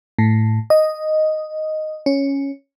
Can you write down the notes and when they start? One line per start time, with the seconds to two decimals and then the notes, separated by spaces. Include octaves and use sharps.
0.19 A2
0.70 D#5
2.06 C#4